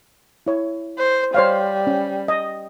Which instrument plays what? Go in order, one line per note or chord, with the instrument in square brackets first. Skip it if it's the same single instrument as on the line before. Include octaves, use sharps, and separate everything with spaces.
[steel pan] E4 C#5
[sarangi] C5
[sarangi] G3 [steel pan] C5 C#5 F5
[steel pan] C#4
D#5